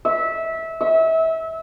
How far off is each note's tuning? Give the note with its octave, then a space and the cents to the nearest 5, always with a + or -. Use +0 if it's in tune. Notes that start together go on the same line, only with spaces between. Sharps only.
E5 -20
E5 -30